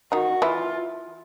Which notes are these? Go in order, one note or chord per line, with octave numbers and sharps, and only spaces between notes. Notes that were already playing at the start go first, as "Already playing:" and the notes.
D#3 D#4 F#4
E3 E4 F4